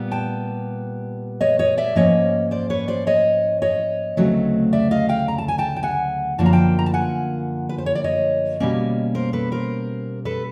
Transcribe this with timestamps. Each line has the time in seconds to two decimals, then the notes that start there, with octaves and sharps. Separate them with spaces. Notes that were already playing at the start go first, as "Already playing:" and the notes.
Already playing: A#2 G3 B3
0.11 G5 A5
1.41 C#5 D#5
1.59 C#5 D#5
1.77 D5 E5
1.95 G#2 F3 A#3 C#4 C#5 D#5
2.51 C5 D5
2.70 B4 C#5
2.88 C5 D5
3.07 C#5 D#5
3.62 C#5 D#5
4.17 D2 C#3 F#3 A3 C4
4.73 D5 E5
4.91 D#5 F5
5.09 F5 G5
5.28 A#5
5.38 A5
5.48 G#5
5.58 G5 A5
5.76 G5
5.83 F#5 G#5
6.38 F#2 D3 F3 A#3 D4 A5
6.46 A#5
6.53 G5 A5
6.79 A#5
6.86 A5
6.94 F#5 G#5
7.69 B4
7.78 C5
7.86 C#5
7.95 D5
8.04 C#5 D#5
8.60 B2 G3 A#3 C#4
9.15 A#4 C5
9.33 A4 B4
9.52 A#4 C5
10.25 A4 B4